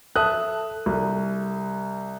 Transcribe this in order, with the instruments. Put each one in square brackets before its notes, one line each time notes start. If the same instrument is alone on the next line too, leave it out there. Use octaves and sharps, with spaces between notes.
[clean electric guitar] A4 [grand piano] E5 D#6 F#6
[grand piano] C2